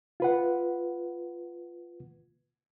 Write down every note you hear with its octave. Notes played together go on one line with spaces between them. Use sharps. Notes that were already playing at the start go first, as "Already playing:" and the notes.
F4 B4 F#5